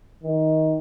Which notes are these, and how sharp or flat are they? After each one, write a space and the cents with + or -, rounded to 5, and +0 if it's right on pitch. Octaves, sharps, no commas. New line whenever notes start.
D#3 +15